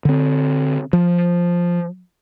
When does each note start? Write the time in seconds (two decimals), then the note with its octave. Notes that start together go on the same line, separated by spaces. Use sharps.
0.05 D3 C4
0.93 F3